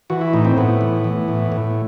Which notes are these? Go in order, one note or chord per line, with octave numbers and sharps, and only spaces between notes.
E3 F#4
E4
A2 D#4
C4
A2 B3
E3
E3
A2
A2